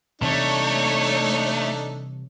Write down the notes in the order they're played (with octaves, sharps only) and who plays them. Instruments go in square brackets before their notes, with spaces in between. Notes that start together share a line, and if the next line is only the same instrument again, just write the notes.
[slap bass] C3 E3 G3 [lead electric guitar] A3 [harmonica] D4 D#4 A4 [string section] C#5